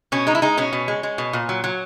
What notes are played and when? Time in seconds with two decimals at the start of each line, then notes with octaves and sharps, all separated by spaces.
0.12 B2 C#4
0.27 G#3 D#4
0.35 E4
0.42 G#3 D#4
0.57 B2 C#4
0.73 B2
0.88 G#3
1.03 G#3
1.18 B2
1.33 A#2
1.49 F#3
1.64 F#3